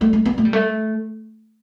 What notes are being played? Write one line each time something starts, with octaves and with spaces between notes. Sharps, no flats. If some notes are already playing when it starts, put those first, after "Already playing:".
A3
A3
B3
A3
G3
A3